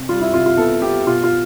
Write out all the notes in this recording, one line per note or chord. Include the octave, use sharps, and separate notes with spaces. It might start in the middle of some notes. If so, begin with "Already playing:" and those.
Already playing: C3
G3 F4
E4
C3 F4
F4
B3 A4
B3 G4
B2 F4
F4